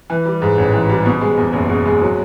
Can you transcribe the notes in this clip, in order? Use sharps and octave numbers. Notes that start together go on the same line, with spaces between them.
E3
G3
G#2
A1
E3
G3
B2
G#3
E2
F#1
B2
G#3
F#3